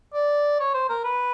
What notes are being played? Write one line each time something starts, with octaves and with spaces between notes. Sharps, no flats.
D5
C#5
C5
A#4
B4